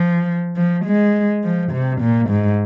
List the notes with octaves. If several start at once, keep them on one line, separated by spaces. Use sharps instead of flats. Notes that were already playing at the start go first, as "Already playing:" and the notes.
Already playing: F3
F3
G#3
F3
C3
A#2
G#2